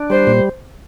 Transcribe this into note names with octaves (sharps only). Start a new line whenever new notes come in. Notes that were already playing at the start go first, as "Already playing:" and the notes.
Already playing: D4
G3 C5
A#2